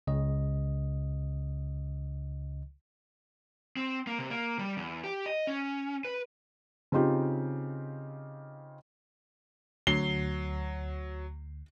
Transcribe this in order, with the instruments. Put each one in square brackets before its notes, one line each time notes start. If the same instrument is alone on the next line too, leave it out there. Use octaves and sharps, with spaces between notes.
[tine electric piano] C#2 C#3 D#5
[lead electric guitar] C4
A#3
C3
A#3
G3
E2
G4
D#5
C#4
B4
[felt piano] C#3 C4 D#4 F4 G4
[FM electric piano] D2 [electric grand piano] F#3 [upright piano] C7 G7